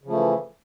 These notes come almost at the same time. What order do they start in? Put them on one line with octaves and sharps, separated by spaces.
C#3 F3 A3 E3